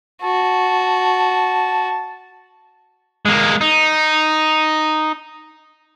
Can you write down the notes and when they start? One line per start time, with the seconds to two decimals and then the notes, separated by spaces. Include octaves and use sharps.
0.23 F#4 A5
3.26 G#3 A#3
3.61 D#4